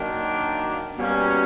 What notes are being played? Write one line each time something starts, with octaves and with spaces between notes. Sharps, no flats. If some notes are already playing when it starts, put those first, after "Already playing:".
Already playing: D#3 F#3 A#3 D4
B2 G3 A#3 C#4